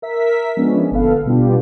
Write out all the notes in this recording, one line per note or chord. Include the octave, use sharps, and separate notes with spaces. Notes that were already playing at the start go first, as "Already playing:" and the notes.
A#4 E5 B6
F3 G#3 B3 C#4 D4
G1 A#2 B3 A4 B4 F5
B2 G3 B3 D4 F4 G4